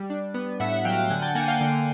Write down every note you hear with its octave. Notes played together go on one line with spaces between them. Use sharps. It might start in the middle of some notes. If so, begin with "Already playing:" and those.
Already playing: G3
D4
B3
A2 E5 F#5
E5 F#5
F#3 F5 G5
F5 G5
D3 F#5 G#5
G5 A5
A#3 F#5 G#5
F5 G5
D3